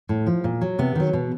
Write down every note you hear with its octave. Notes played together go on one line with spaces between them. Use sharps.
A2
F3
A#2
F#3
C3 B3
D#3 F#3
B2